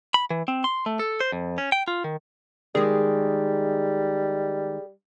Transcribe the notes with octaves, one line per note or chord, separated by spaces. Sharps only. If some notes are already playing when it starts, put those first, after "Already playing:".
B5
E3
C4
C6
A3
A4
C5
F2
C#4
G5
F4
D#3
D#3 G3 G#3 G#4